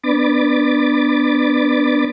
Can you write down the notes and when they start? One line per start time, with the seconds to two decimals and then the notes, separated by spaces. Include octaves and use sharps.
0.03 B3 D4 B5 D6 A6